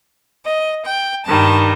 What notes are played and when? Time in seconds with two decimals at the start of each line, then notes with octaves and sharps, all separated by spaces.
0.45 D#5
0.85 G5
1.25 G2 D#3 G3 A5